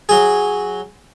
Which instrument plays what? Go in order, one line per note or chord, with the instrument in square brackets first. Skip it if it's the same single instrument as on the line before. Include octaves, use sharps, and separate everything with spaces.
[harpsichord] F#3 G#4